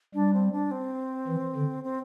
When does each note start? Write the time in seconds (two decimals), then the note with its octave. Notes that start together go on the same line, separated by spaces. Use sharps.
0.14 G3 D4
0.33 C4
0.52 D4
0.71 C4
1.27 E3
1.55 D3
1.84 C4